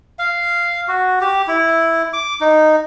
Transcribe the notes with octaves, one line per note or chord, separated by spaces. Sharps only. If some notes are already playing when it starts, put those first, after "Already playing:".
F5
F#4
G4
E4
D6
D#4